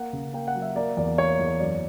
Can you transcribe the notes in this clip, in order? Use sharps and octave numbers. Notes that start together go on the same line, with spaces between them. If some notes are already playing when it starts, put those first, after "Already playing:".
Already playing: A#3 F#5
C#3
A#3 G5
F#5
F#3
E5
A#3 D5
E2 D5
A#3 C#5
E2
F#2 D5